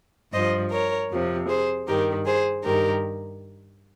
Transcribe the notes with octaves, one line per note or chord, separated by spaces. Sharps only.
G2 F3 C5 D#5
A#4 C#5
F2 C3 F3
G#4 C5
G2 D#3 G4 A#4
G#4 C5
G2 D#3 G4 A#4